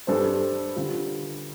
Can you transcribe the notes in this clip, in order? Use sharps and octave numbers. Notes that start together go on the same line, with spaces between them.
G2 G3 D4 A4 C5
D3 G3 F4